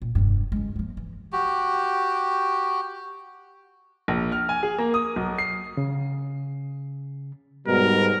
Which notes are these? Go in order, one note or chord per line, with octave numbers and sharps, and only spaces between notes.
A#2
F1 G2
C#2 G#3
F3 A#3
E3
F#4 G4
A#1
F6
G#5
G#4
A#3
D#6
B1
C7
C#3
G#2 B2 G3 A#4